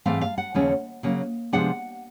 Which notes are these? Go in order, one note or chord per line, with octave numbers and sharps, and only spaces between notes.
G#2 E3 A3 C4 F5
F5
F#5
D#2 C#3 F3 A3 C#4
C#3 F#3 A#3 C#4
C3 F3 G#3 B3 D4 F#5